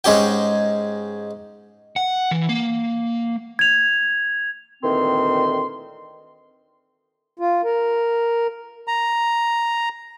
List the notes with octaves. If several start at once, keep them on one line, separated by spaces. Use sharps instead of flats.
G#2 G#3 C#4 G4 G5
F#5
E3
A#3
G#6 F7
D2 A#2 D#3 E3 C4 C6
F4
A#4
A#5